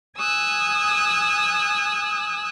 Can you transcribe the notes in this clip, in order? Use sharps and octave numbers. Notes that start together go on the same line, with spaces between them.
G#5 D#6 E6 F#6